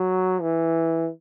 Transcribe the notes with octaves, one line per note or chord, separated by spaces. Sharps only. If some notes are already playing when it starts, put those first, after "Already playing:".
Already playing: F#3
E3